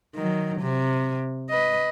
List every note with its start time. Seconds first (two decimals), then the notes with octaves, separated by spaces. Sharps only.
0.15 D#3 F#3
0.61 C3
1.50 B4 D#5